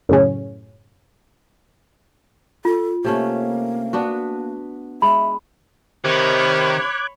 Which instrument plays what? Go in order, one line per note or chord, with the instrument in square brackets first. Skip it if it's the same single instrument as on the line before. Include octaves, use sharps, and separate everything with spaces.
[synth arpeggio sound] F#2 A2 C#3 C#4
[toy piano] F4 [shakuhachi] A4
[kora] C3 A3 C#4 [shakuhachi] A#3
[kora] B3 D4 F#4
[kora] G#3 [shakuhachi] E5 [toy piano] B5
[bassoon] C3 [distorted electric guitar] D#3 [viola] C#5 B5 [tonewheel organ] D6 F#6 G#6